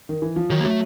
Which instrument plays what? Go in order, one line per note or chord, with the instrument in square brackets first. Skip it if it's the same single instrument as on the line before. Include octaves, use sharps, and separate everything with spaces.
[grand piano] D#3
E3
F3
[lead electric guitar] D#3 [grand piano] F#3
[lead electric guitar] A#3
[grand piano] F#3 [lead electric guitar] A3